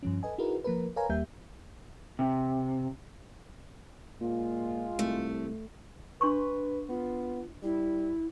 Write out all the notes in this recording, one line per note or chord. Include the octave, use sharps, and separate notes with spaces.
G2 F3 C#4
A4 B4 D#5 G#5
D#4 E4 F#4 G#4 A#4 B4
F3 A#3 A#4 B4
A#4 B4 C#5 F5 G#5 A#5
D#2 G3 A#3 G4 E5 G6
C3
A#2 G#3 F4
C2 A3
D4 B4 C6 C#6
B3 F4
G3 E4